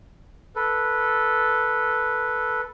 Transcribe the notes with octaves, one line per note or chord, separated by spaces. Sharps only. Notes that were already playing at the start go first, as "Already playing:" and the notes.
A4 B4